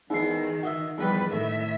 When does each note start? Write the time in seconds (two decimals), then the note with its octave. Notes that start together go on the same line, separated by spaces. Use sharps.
0.10 E2 G#2 D#3 E3 D#4 C7
0.63 F#4 D#5 E5
0.98 E2 D#3 F3 G3 G4 B4
1.32 A2 D#3 A3 E5